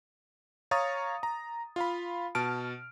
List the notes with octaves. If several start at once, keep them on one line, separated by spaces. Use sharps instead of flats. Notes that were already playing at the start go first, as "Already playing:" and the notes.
C#5 F5 A#5 C#6 D#6 A6
A#5
F4 F5 B5
B2 A5 F6 D7